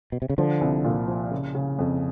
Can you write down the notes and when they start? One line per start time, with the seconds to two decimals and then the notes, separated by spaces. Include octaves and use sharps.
0.12 B2
0.22 C3
0.30 C#3
0.38 D3 F3
0.61 C2
0.84 A#2
1.08 F3
1.31 C#3
1.55 C#3
1.79 F2